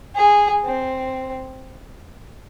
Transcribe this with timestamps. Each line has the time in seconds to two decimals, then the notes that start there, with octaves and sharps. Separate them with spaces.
0.15 G#4
0.64 C4